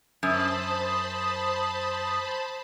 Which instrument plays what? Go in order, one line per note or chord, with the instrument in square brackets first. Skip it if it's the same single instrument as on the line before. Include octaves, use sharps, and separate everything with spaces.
[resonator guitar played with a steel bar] F#2 [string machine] C5 A5 B5 [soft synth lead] D#6